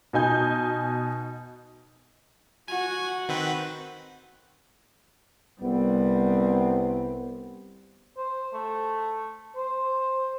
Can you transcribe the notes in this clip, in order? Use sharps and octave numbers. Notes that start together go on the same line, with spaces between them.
B2 D#4 G#5 G6
F#4 F#5 G#5
D#3 C4 B4
C2 G3 B3 C4
C5
A3
C5